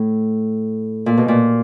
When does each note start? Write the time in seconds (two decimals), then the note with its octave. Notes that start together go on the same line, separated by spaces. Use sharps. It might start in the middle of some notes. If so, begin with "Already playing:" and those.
Already playing: A2
1.06 A#2
1.17 B2
1.28 A#2